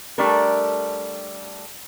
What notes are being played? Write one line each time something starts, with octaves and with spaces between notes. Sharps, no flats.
G3 A3 D4 A4 A#4